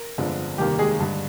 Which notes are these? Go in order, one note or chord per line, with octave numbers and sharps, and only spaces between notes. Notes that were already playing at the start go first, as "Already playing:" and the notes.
Already playing: A#4
G1 F2 D3 F3 G#3
F1 D#2 D#3 G3 A#3 G4
G#3 G#4
G2 D3 G#3